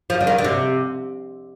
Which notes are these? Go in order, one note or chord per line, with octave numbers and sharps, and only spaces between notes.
F3
D3
D#3
D3
C3